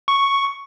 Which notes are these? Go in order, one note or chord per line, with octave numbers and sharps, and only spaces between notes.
C#6